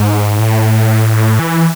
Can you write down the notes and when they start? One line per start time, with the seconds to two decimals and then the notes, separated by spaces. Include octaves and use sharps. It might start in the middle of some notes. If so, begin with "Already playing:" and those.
Already playing: G#2
0.39 A2
1.39 E3